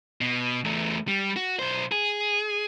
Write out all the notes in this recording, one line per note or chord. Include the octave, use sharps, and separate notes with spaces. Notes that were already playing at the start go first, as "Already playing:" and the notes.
B2
E2 A3
G3
F#4
B1 C5
G#4